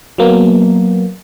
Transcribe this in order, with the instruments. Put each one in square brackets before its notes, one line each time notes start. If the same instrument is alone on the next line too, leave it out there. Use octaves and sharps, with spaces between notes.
[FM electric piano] F#3 A#3 B3